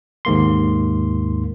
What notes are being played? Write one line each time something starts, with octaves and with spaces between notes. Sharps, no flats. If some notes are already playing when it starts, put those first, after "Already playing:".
D#2 G#2 A#3 C6